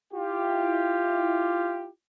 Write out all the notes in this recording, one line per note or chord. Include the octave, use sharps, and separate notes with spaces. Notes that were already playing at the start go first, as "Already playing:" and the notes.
E4 F4 G4